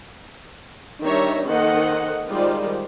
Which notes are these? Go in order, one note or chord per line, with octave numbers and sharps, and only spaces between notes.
D#3 G3 D4 C#5 E5 A#5
D#3 A#3 A4 C5 D#5 F#5
D#3 G3 G#3 F4 C5 D5